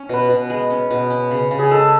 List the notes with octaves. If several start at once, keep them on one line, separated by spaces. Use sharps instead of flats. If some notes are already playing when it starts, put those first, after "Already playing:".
Already playing: C#4
B2 B4
B2
G#3
C#4
B2
C#4
C#3
C#3
G#4
G#3 A4